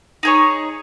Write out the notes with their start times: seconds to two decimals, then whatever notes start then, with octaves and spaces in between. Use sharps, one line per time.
0.23 D#4 G#4 C#5